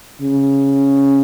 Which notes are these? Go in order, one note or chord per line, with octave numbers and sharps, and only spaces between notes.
C#3